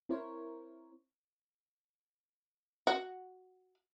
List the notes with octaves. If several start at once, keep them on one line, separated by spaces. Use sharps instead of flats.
C4 E4 A#4 C5 C#5
F#4